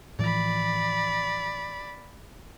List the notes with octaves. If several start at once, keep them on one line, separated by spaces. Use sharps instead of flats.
A2 E3 F3 D5 B5